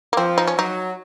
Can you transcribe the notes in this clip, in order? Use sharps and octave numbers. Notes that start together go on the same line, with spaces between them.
A#3
F3 C4
D#4
C#4
F#3 D#4